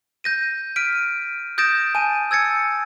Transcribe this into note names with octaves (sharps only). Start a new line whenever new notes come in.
G6 A#6 D#7
F6 B6 D7 D#7
D#6 G6 A6 A#6 D7 E7
G#5 A5 D#7
E6 G#6 A6 C#7